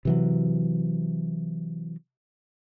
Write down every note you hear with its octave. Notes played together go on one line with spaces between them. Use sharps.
C3 E3 F#3